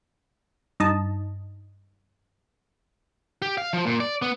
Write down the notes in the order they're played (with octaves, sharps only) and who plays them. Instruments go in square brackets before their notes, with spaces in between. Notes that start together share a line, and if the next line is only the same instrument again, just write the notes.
[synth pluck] G2 D#4 D#5 A5
[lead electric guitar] G4
F5
F3
A#2
D5
B3